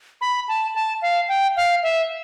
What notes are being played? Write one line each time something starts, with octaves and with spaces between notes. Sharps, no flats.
B5
A5
A5
F5
G5
F5
E5